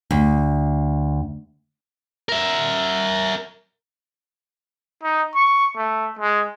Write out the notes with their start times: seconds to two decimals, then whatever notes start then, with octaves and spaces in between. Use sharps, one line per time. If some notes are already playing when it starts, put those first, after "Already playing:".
0.11 D2
2.29 A#4 E5
5.03 D#4
5.35 C#6
5.77 A3
6.19 G#3